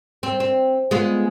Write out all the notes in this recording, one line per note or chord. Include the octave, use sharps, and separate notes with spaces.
C4
C4
G#3 B3 F4